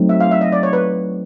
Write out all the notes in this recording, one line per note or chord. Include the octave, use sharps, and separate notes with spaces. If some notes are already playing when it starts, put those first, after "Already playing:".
Already playing: F#3 A3 C4 D#4
E5
F5
E5
D#5
D5
C#5
B4